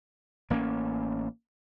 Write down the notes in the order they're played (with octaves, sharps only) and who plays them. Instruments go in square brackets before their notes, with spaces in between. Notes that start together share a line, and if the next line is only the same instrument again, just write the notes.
[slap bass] A1 A#3 B3 C#4